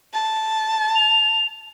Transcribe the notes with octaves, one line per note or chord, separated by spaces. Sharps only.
A5
F7